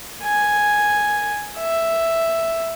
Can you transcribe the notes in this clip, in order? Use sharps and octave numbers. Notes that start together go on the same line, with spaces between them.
G#5
E5